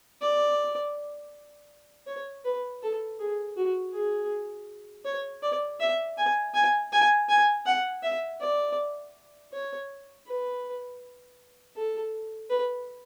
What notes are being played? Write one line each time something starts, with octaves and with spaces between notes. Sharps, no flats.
D5
C#5
B4
A4
G#4
F#4
G#4
C#5
D5
E5
G#5
G#5
G#5
G#5
F#5
E5
D5
C#5
B4
A4
B4